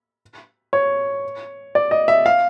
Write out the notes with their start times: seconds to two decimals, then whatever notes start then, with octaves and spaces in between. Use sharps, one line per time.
0.73 C#5
1.75 D5
1.91 D#5
2.08 E5
2.26 F5